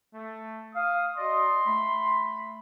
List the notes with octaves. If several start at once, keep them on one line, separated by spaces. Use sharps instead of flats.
A3
F5 D#6
F#4 D5 D#5 C6
A3 B5